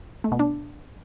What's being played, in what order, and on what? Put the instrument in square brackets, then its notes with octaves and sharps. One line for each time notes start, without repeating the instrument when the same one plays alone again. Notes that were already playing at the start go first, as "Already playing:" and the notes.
[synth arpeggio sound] A3
B2
D4